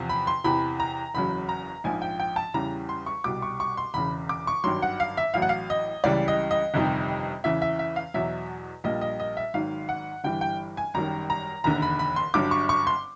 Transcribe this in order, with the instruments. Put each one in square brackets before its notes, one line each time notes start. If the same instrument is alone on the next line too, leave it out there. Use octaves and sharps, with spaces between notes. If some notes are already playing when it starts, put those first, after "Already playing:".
Already playing: [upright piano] E2 C3 F3
B5
C6
E2 C3 E3 B5
A#5
F#1 E2 C#3 F#3 B5
A#5
A#1 G#2 F3 G#5
G5
G5
A5
E2 C#3 E3 G3 A#5
C6
C#6
C2 B2 G3 D6
C#6
C#6
C6
E1 E2 C#3 B5
D6
C#6
G#1 G2 D#3 F#3 C6
F#5
F5
E5
A1 A2 F#3 F5
F#5
F5
D#5
C#2 C#3 E3 G3 D5
D#5
D#5
G1 F2 C3 D#3 G3
E2 C#3 E3 E5
E5
E5
F5
E2 B2 F#3 E5
A#1 A#2 G3 D#5
D#5
D#5
E5
G#1 G#2 D#3 F#3 F5
F#5
G1 G2 E3 G3 G5
G5
G#5
G#1 F#2 D#3 G3 A#5
A#5
E1 D#2 D3 A#5
B5
B5
C6
G1 G2 D3 F#3 D6
C#6
C#6
C6